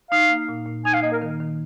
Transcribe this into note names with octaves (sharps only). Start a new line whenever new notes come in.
D#4 F5
A#3
A#2
A#2
D#4 G#5
F5
A#3 D#5
A#4
D#3
D#3